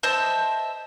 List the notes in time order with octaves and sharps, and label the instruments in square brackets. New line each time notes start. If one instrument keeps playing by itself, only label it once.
[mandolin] C5 D#5 E5 A5